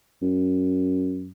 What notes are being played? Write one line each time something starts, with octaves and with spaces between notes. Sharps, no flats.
F#2